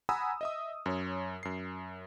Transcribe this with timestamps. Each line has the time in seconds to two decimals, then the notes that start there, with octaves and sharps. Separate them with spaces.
0.09 F#5 G#5 A#5 B5 D#6 E6
0.41 D#5 E5 D#6
0.86 F#2 C#5
1.43 F#2 C7